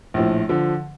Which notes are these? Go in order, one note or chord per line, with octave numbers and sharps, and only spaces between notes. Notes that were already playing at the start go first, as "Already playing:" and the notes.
A#1 A2 F3
D3 F3